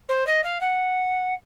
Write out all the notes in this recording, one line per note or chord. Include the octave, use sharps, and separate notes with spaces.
C5
D#5
F5
F#5